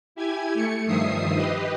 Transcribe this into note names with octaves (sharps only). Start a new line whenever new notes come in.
E4 G4 G#5 G#6
A3 C#7
G2 D#3 F3 E5 D#6 C7
G4 B4 D#5